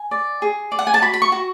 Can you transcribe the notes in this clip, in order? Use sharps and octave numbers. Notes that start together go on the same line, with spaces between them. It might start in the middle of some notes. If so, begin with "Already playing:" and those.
Already playing: G#5
D5
G#4
D5
F#5
G#5
A5
F#4 B5
B5
C#6
F#4